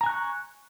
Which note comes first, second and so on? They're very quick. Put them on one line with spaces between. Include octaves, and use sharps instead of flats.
A#5 G#5 F#6 C#6